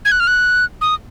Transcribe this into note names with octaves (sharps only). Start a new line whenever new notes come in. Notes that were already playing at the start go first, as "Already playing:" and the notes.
G#6
F#6
F6
F#6
D#6